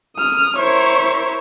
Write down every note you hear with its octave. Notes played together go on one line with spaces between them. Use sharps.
D#6 F6
E4 A#4 C5 C#5 C#6